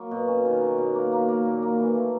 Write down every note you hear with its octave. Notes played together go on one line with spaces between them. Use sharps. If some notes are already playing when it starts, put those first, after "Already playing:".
Already playing: F#3 A#3
B2
C#4
D#3
F#3
B2
A#3
A#3
A#3
A#2
A#3
E3
A3